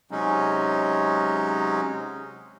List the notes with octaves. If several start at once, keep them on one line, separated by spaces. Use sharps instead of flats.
C3 F#3 G#3 C#4 D#4